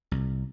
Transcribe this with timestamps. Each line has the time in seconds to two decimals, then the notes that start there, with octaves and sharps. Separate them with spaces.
0.11 C2